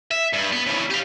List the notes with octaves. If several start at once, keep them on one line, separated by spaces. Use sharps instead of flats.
E5
G2
B3
C#3 E3
G4 F5